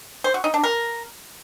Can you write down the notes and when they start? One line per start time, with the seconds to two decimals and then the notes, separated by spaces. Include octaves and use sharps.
0.24 C5
0.34 F#4
0.44 D#4
0.54 D4
0.64 A#4